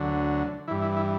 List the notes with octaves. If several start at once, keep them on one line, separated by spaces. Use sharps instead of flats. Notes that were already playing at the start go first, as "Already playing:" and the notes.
Already playing: D2 D3 F#3
G2 E3 E4
E4
E4